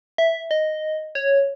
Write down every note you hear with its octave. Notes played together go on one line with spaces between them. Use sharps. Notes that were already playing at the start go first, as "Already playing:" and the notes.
E5
D#5
C#5